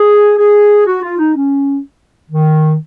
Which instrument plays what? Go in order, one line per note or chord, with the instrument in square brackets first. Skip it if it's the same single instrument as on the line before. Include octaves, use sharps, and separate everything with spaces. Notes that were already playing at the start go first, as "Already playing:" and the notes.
Already playing: [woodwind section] G#4
G#4
F#4
F4
D#4
C#4
D#3